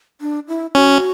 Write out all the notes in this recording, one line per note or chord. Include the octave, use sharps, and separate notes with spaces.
D4
E4
C#4 F#4